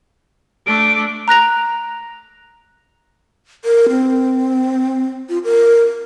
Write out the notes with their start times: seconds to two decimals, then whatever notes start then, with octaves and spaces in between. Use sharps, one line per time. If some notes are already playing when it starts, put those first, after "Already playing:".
0.67 A3 D4 D7
1.28 A#5 F#6 A#6 F7
3.65 A#4
3.89 C4
5.29 F4
5.44 A#4